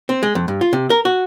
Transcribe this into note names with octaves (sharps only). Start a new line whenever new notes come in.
C4
G#3
F2
G2
F4
C3
A#4
F#4